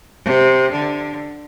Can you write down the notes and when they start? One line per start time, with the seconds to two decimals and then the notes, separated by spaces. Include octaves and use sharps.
0.25 C3
0.72 D3